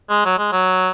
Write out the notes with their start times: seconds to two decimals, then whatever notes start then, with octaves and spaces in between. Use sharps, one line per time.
0.10 G#3
0.25 F#3
0.38 G#3
0.52 F#3